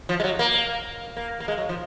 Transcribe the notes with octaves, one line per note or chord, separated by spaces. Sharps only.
F3
G#3
F#3
A#3
A#3
A#3
G#3
F#3
F3